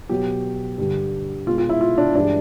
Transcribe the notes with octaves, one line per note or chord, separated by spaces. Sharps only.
B2 F#3 G4
G2 D3 G3
B2 G#3 F4
F4
E4
F4
D4
G2 E3 G#3 D4